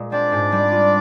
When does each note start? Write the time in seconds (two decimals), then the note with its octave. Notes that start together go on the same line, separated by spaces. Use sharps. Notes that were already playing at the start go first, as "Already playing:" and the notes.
Already playing: A#2 G#3
0.12 C4 D4 D5
0.32 G#2
0.52 G3
0.72 F4